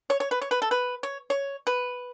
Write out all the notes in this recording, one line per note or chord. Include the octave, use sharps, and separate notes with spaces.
C#5
C#5
B4
C#5
B4
A4
B4
C#5
C#5
B4